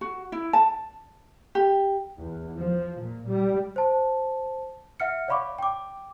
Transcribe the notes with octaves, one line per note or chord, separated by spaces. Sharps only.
F#4
E4
A5
G4
E2
F3
A#2
G3
C5 A5
E5 F#5 F6 C#7
C#5 D5 F5 B5 C#6 D6
G5 D6